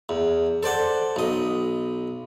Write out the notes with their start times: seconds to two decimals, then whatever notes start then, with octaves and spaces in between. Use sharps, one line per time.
0.09 E2
0.63 A4 C5 D5 F#5
1.16 B1 D#5